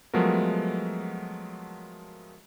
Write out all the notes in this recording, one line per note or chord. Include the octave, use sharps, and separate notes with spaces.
F3 F#3 G#3 A3 B3 A#4